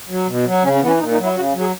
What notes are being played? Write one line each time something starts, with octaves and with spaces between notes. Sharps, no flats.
F#3
B2
F#3
C#3 C#4
C#4
E3 B3
C#4
A#2 D#4
D#4
F#3
E4
C#3 F#4
F#3
G#4